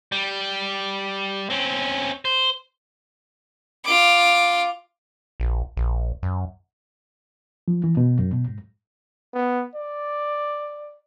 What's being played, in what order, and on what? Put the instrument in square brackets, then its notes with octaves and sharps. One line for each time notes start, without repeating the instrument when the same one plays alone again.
[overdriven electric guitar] G3
C4 C#4
C5
[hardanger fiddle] F4 D6
[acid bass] A#1
A#1
F#2
[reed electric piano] F3
E3
B2
F#2
B2
G#2
[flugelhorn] B3
D5